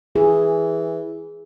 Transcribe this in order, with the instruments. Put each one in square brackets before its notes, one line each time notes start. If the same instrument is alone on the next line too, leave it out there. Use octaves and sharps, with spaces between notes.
[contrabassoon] E3 [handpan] G#4